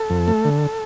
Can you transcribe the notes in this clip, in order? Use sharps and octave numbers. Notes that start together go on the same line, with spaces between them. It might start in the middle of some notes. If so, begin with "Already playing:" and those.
Already playing: A4
F2
A3
D3